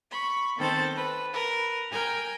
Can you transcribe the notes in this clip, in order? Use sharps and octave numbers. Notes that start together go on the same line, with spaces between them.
B5 C#6
D#3 B3 C4 A4 C5 A6
B4
A#4 B4
A#4 G5 G#5 A#5